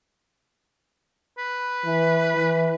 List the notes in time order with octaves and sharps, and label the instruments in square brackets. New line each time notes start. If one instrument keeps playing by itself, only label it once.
[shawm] B4
[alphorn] E3
E3